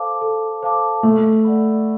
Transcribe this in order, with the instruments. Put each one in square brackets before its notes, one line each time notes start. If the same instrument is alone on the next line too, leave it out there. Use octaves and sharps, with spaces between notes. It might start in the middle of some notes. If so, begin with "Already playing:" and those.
Already playing: [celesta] A4 C5 F5 A5 D6
A4
C5 F5 A5 D6
[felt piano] A3 [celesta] A4
[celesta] D5 F#5 B5